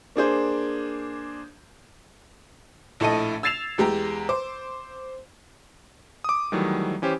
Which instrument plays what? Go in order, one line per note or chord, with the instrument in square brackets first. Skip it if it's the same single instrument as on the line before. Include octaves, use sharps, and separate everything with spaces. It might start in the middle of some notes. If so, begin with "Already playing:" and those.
[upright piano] A#3 D4 G#4 C5
[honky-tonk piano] A#1 A2 A3 A4 D#5 D#7
E6 G#6 A6 C7 E7 F7
E2 G#3 G4 A#5
C5 D6
[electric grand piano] D6 D#6
D#3 E3 F#3 G3 A3
E3 C#4 G4 C5